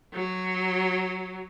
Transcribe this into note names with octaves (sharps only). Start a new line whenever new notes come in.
F#3